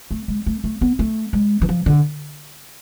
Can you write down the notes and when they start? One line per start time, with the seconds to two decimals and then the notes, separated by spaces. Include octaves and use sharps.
0.11 A3
0.28 G#3
0.46 A3
0.64 A3
0.81 B3
0.99 A3
1.33 G#3
1.62 E3
1.69 F3
1.86 D3